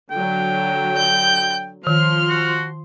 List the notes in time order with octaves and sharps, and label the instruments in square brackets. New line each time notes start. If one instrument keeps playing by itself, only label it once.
[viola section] D3 F#3 [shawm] G5
[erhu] G6
[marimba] D#3 [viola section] F3 C6 [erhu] F6
[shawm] F#4